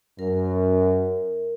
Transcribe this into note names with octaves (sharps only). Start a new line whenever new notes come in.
F#2 A#4